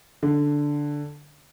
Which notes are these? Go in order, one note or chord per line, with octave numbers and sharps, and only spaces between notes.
D3